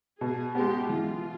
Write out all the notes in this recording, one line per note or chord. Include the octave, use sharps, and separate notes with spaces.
B2 G#4
G#3 B3 G4
E3 F4